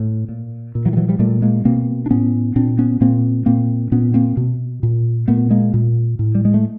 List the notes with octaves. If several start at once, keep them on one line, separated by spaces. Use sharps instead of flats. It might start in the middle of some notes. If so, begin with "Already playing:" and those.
Already playing: A2
A#2
A#2
E3 F#3
G3
E3 F#3
F3 G3
A#2 G3 A3
G#3 A#3
B2 A#3 C4
D4
A2 B3 C#4
A#2 C4 D4
B3 C#4
A#2 A#3 C4
A#2 A#3 C4
A#2 B3 C#4
A#3 C4
B2
A#2
A#2 A3 B3
G#3 A#3
A#2
A2
G3
G#3
A3